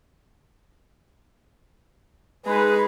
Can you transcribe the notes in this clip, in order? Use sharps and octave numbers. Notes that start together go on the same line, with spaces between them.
G#3 D#4 G#4 B4